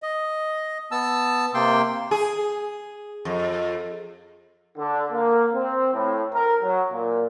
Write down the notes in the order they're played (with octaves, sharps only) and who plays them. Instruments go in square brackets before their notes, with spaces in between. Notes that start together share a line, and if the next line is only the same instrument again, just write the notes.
[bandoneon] D#5
B3 A5 E6
C3 A#3 G5 C6
[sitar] G#4
F2
[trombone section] D3
A#3
C4
A2
A#4
F#3
A#2